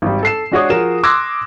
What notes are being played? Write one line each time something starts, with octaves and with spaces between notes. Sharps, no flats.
G#1 G3
A4 C7 E7
G#3 D4 F#4 G#4 C#5 D#6
F3 F#4 G#4 A#4 E7
C6 D6 E6 F#6 G#6 A#6